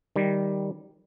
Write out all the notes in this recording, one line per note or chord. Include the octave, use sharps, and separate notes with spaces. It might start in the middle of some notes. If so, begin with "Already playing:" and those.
D#3 G3